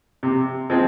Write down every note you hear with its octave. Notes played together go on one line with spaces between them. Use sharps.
C3
F3 G#3 C4